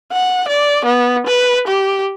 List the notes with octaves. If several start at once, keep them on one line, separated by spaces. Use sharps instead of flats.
F#5
D5
B3
B4
G4